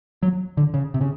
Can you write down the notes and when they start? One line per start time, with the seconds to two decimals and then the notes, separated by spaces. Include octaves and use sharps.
0.23 F#3
0.57 D3
0.74 C#3
0.94 C3
1.01 C#3